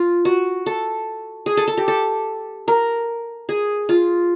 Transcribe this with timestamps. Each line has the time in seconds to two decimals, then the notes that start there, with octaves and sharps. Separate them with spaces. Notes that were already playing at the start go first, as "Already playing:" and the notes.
Already playing: F4
0.25 F#4
0.66 A4
1.46 G#4
1.57 A4
1.68 A4
1.77 G4
1.88 A4
2.68 A#4
3.49 G#4
3.89 F4